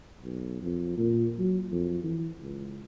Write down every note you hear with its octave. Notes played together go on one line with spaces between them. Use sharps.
B1
F2
A#2
F#3
F2
E3
C#2